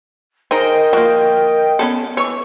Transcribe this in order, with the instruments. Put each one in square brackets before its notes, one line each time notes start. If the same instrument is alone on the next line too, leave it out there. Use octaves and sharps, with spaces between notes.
[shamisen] D#3 [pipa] D#4 G#4 C5 [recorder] A#4 [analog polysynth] D#5 G5
[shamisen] F3 A#3 [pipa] F#4
[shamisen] B3 C#4 A4
[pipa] E3 C#6 [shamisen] C#5